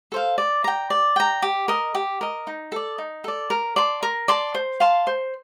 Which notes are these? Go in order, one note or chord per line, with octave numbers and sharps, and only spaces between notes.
A4 C5 F5
D5
G5 A#5
D5
G5 A#5
G4
A#4 D#5
G4
A#4 D#5
D#4
A4 D5
D#4
A4 D5
A#4
D5 A5 C6
A#4
D5 A5 C6
C5
F5 A5 C6
C5